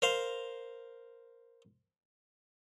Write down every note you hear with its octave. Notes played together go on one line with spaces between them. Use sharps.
A#4 C5 F5